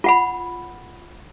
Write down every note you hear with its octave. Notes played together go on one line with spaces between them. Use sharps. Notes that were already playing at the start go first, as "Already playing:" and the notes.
F4 F#5 B5